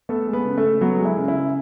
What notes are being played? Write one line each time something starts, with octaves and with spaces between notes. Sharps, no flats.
A3 B3 A4
G#3
B3 B4
C#3
A3 A4
C#3
F#3 B3 F#4
G#3
E4
C#3
E4
C#3